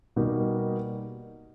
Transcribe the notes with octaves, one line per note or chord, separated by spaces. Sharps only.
B2 G3 A#3 D#4